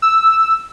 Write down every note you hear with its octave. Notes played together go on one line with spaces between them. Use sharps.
E6